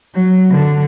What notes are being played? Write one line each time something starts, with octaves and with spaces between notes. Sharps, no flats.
F#3
D3